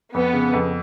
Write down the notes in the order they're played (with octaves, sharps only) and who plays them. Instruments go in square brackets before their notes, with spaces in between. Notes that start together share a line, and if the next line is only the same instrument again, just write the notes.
[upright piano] F2 [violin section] B3
[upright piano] C#3
F2